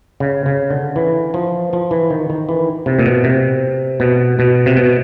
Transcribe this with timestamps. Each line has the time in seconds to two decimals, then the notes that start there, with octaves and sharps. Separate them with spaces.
0.20 C#3
0.46 C#3
0.71 D3
0.96 E3
1.34 F3
1.73 F3
1.91 E3
2.10 D#3
2.30 D#3
2.49 E3
2.86 C3
2.99 A#2
3.06 B2
3.24 C3
4.00 B2
4.39 B2
4.66 C3
4.77 B2